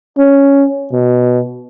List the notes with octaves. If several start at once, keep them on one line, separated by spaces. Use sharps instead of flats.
C#4
B2